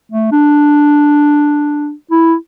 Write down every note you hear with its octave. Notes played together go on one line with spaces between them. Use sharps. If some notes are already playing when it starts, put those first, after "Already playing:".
A3
D4
E4